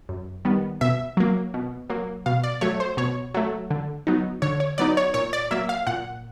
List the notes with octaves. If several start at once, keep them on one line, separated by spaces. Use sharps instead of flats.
F#2
D#3 G3 B3
B2 E5
F#3 A#3
B2
F#3 A#3
B2 F5
D5
F#3 A3 C#5
C5
B2 C#5
F#3 A3
D3
F#3 B3 D#4
D3 C#5
C#5
F#3 B3 D#4 D5
C#5
A#2 C#5
D5
F#3 A#3 E5
F5
A#2 F#5